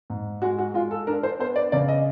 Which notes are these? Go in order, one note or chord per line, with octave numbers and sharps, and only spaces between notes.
G#2
G#3 F#4
F#4
G#3 F4
A4
D4 A#4
C5
B3 C5
D5
C#3 D5
D#5